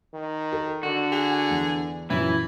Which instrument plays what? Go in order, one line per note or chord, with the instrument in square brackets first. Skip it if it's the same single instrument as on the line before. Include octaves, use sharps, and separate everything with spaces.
[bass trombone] D#3
[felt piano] A4
[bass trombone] D3 [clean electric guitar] F#4
[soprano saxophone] G#4
[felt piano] E2
[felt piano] F#2 A#2 C#4 [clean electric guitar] E3 [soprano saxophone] E4